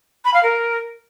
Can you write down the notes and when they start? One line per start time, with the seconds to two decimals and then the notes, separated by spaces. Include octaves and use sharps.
0.24 B5
0.33 F5
0.43 A#4